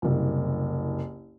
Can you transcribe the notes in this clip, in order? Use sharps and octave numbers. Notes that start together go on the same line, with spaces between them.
F#1 C2